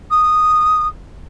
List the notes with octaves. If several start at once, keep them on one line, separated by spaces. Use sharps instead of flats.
D#6